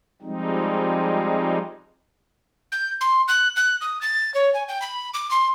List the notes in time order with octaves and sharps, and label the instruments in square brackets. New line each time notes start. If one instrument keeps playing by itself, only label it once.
[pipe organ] F3 G3 G#3 C4 D#4
[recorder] G6
C6
F#6
F#6
D#6
A6
C#5
G#5
G5
B5
D6
C6